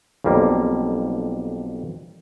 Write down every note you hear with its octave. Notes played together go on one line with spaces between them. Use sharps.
B1 F2 G3 A#3